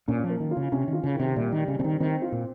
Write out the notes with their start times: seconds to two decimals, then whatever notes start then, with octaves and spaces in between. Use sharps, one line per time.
0.08 A#2 C#4
0.24 F3
0.29 A#3
0.40 D#3
0.51 F4
0.57 C#3
0.72 C3 C#4
0.88 D#3
0.93 F4
1.04 C#3
1.14 D#3
1.20 C3
1.36 A#2 G3
1.52 D#3 G3
1.68 C#3
1.79 C#3 C4
1.84 D#3
2.00 D#3 C4
2.22 F4
2.32 A#2